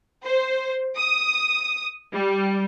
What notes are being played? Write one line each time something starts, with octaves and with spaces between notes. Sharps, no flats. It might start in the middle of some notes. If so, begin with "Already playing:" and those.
C5
D#6
G3